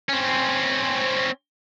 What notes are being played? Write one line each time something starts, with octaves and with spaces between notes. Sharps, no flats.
C4 C#4